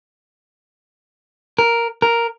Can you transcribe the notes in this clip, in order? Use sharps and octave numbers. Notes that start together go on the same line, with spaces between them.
A#4
A#4